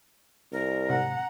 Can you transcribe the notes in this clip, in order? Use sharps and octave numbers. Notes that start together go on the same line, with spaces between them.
C2 A#4
G#1 C3 F#5 A#5